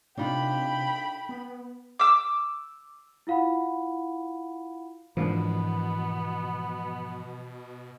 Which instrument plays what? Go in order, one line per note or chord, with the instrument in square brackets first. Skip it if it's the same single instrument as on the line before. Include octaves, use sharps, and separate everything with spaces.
[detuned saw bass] C3 [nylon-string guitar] D4 D#4 F4 [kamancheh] G5 B5
[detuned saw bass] B3
[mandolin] D6 E6
[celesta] E4 F4 F5 F#5 B5
[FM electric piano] G#2 F3 [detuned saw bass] B2 [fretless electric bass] E3 A#3 D4 [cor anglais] B3